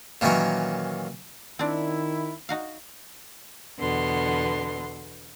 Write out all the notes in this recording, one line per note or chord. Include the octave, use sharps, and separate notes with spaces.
A#2 D#3 E3 F#3 C#4
D#3 C4 D4 E4
D#4 F#4 F5
E2 B2 D3 B3 C6